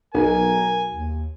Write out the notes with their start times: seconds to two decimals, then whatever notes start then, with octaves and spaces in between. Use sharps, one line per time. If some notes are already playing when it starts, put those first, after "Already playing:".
0.15 B1 A#4 G#5
0.90 D#2